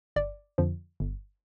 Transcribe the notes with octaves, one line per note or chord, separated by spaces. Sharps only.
G1 D5
F2 D3 F3
G1